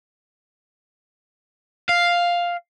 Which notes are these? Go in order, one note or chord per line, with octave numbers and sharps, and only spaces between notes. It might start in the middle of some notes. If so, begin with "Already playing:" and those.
F5